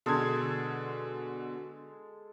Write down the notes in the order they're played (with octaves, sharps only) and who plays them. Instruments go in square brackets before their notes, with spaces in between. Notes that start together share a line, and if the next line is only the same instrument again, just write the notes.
[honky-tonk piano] B2 D3 G#6 [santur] G#3 A4